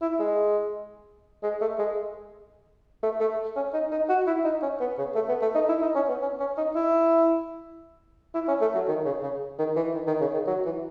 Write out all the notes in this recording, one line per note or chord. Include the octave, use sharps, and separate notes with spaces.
E4
G#3
G#3
A3
G#3
A3
A3
C#4
D#4
D#4
F#4
E4
D#4
C#4
B3
C#3
A3
B3
A3
D#4
E4
D#4
C#4
B3
C#4
C#4
D#4
E4
E4
C#4
A3
F#3
D#3
C#3
C#3
D#3
E3
D#3
D#3
C#3
D#3
F#3
E3